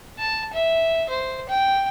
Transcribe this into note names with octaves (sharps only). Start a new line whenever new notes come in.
A5
E5
C5
G5